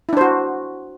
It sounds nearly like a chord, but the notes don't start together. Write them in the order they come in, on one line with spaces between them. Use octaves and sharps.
E4 D4 C5 F#4